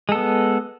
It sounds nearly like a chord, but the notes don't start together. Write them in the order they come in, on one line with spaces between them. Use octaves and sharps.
G#3 A4 B3